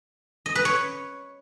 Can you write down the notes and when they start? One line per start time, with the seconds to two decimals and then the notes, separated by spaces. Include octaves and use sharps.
0.46 D#5
0.55 B4
0.65 C#5